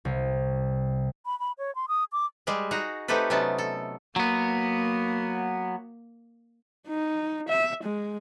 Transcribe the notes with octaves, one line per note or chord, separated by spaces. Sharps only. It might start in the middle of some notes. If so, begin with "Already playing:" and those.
C2
B5
B5
C#5
C6
D#6
D6
G3 G#3 G4 G#4
D#4 F#4 G#4 A#5
A3 C4 D#4 G4 A4 B4
C3 F#3 B3 C#4 D#4 A5
A4
F#3 A#3 B3
D#4
E5
G#3